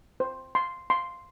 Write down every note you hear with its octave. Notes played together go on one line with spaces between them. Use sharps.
C5
C6
C6